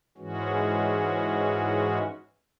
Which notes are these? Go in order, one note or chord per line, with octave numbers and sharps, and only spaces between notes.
G#2 E3 G#3 C#4 F#4